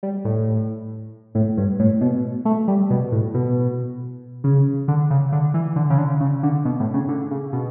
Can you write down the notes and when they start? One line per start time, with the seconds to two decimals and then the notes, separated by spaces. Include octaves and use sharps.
0.03 G3
0.25 A2
1.35 A2
1.57 G2
1.79 A2
2.01 B2
2.45 A3
2.68 G3
2.90 B2
3.12 A2
3.34 B2
4.44 C#3
4.88 D3
5.10 C#3
5.32 D3
5.54 E3
5.76 D3
5.90 C#3
5.98 D3
6.21 C#3
6.43 D3
6.65 B2
6.80 A2
6.94 C#3
7.09 D3
7.31 C#3
7.53 B2